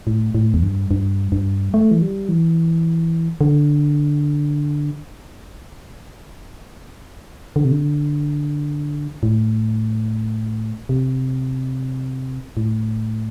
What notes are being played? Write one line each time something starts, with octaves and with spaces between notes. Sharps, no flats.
A2
A2
E2
G2
G2
G2
A3
E3
G3
E3
D3
D3
C3
D3
A2
C3
A2